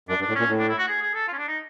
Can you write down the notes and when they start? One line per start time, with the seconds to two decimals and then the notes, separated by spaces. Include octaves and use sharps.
0.09 F#2 D4
0.19 G2
0.22 D4
0.29 A2
0.35 A#2 C#4
0.49 A2
0.59 D4
0.68 E4
0.78 F#4
0.88 G#4
1.01 G#4
1.15 A4
1.28 F4
1.33 C#4
1.38 D4
1.48 D#4